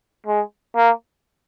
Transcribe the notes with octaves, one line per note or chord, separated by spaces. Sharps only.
G#3
A#3